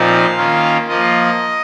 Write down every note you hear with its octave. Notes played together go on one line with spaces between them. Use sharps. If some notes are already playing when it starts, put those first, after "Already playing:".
Already playing: A#2 F3 C4 D#4 F5
D#3 A#3 C#4 F4
F3 A#3 F4 D#5